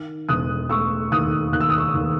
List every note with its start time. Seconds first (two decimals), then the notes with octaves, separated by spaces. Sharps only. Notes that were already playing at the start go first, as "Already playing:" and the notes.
Already playing: D#3
0.29 E1 D#6 F#6
0.69 A3 C#6 E6
1.12 D#2 D#6 F#6
1.52 D#2 F#6
1.61 E6
1.70 D#6
1.78 C#6 E6
1.94 D#2